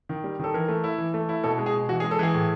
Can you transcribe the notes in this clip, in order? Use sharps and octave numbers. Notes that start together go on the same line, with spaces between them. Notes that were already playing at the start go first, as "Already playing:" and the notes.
D#3
G3
D#3 A4
E3 A#4
A3
E4
E3
A3
E4
B2 A4
G#3
G#4
B2
E3 F#4
G#4
G#3
A4
E3 G#4
A2